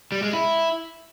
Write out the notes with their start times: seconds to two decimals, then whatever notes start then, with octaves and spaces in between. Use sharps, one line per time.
0.12 G3
0.23 G#3
0.33 E4